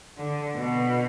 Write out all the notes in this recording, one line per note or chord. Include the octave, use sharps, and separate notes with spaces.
D3
B2